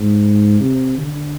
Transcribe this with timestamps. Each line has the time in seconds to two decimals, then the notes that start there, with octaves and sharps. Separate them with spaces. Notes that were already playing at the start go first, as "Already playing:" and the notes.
Already playing: G#2
0.59 C3
0.98 D3